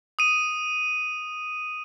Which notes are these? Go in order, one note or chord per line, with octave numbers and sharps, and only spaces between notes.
D#6 D#7